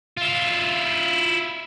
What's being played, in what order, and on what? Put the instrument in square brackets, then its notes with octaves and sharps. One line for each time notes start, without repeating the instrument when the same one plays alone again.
[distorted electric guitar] E4 F4